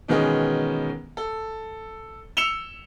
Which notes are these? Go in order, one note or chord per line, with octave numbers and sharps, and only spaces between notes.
B2 D#3 E3 G#3 B3 C#4
A4
E6 C#7 E7 F7 G7